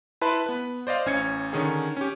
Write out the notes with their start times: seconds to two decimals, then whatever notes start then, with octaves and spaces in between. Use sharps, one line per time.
0.21 E4 B4 E5 A5 C6
0.46 B3 B4
0.87 C5 D5 D#5 F5
1.06 A1 C#4 G#6 C#7
1.53 D3 D#3 C#4 G#4
1.97 C#4 G4